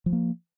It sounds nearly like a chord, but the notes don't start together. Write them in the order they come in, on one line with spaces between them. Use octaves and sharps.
F3 G3 A#3